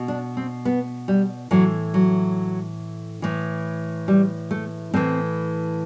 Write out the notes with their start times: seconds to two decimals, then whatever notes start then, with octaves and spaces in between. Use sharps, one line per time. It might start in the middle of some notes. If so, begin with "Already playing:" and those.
Already playing: B2
0.08 D4
0.37 C4
0.65 B3
1.08 G3
1.51 A2 E3 F#3
1.94 F#3
3.22 A2 E3
4.08 G3
4.51 A3
4.94 A2 E3 C4